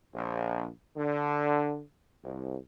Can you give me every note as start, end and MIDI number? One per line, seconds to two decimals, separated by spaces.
0.15 0.69 34
0.97 1.82 50
2.23 2.58 36